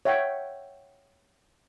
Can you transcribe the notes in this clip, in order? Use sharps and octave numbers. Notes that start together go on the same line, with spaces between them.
C#5 E5 F#5 G5